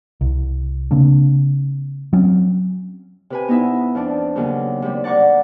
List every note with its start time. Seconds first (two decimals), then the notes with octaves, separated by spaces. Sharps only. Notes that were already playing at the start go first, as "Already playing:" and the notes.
0.21 C2
0.91 C#3 A#3 C4 D4
2.13 F#3 C4 C#4
3.30 C3 B4 G#5
3.48 B3 D#4 E4 E5
3.95 F2 F3 D4
4.36 D#2 C#3 F#3
4.82 C3 G3
5.04 D5 F#5 A#5 C#6 D6